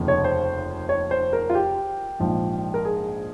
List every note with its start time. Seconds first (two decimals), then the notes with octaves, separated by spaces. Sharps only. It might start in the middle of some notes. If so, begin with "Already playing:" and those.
Already playing: F1 D#2 C#3 F3
0.08 C#5
0.24 C5
0.89 C#5
1.11 C5
1.33 A#4
1.50 F4
1.55 G4
2.20 A#1 G#2 F3
2.74 A#4
2.85 G#4